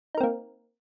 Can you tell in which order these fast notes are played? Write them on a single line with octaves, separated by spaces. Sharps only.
D#4 A#4 C4 A#3